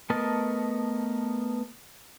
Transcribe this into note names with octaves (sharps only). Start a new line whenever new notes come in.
A3 B3 A#4 D#5 A5